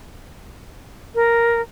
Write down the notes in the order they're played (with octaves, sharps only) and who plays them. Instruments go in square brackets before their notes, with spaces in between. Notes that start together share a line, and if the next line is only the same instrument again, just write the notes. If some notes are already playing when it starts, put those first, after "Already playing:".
[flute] A#4